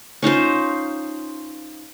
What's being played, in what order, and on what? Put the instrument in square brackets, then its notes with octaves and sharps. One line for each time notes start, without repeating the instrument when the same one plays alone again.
[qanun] C#4 D#4 F4 C5